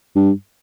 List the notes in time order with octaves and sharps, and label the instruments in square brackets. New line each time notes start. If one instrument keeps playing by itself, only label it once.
[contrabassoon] G2